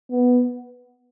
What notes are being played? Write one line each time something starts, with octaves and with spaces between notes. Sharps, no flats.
B3